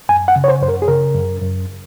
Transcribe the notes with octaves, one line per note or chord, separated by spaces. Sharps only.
F#2 G#5
F#5
C#3
C#5
C5
F#2 C5
A#4
G#4
C#3 A#4
F#2
F#2